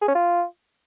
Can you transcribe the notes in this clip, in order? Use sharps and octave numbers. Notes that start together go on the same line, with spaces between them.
G#4
C#4
F4